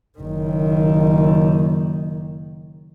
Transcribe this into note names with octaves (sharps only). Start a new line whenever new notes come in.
F#1 D#3